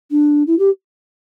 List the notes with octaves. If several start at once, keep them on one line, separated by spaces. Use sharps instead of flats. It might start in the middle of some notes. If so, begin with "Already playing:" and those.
D4
E4
G4